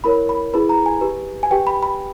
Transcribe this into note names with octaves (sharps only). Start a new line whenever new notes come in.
E4 A#4 C#5 B5
B5
E4 G#4 B4 B5
A#5
G#5
G4 B4
G#5
G4 B4 G5
B5
B5